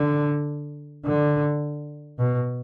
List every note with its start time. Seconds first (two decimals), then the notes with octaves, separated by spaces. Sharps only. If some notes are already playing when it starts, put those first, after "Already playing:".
Already playing: D3
1.05 D3
2.19 B2